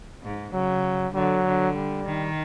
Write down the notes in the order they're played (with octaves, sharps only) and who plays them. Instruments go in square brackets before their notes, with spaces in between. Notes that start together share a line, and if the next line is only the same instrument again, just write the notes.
[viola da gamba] G#2
[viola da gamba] C#3 [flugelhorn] F#3
[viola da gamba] D3 [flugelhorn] F#3
[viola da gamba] D3
[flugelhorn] G3
[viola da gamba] D#3